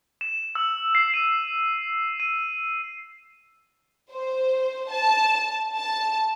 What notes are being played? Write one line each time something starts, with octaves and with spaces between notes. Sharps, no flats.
E7
E6
C7
D#7
D#7
C5
A5
A5